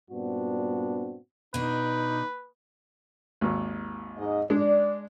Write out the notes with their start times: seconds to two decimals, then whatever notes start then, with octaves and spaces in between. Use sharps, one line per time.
0.10 G2 A#2 B3 C4 D4 F#4
1.54 B2 D4 D#4 B4
3.41 G#1 D#2
4.18 G#2 D#5
4.50 G#3 D4 D5